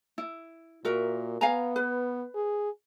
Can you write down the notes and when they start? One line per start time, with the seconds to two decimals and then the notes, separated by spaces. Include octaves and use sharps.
0.18 E4
0.85 A#2 F#4 A#4 E5
1.41 B3 F5 G#5 A#5
1.76 B4
2.35 G#4